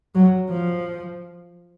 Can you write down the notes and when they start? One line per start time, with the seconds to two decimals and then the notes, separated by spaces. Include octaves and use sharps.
0.15 F#3
0.50 F3